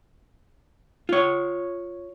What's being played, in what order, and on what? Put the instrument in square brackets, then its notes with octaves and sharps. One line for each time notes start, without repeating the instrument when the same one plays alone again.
[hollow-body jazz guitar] F4 C#5